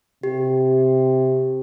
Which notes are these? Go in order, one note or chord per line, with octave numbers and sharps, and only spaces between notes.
C3 G4